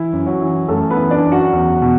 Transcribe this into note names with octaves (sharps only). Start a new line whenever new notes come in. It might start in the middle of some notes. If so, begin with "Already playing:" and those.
Already playing: E3 E4
F#2
F#3 F#4
E3
F#2 A3 A4
B3 B4
E3
D4 D5
F#2
F#4 F#5
E2
B2